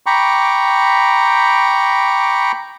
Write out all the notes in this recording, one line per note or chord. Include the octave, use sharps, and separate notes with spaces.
G5 A#5 B5 C#6 D6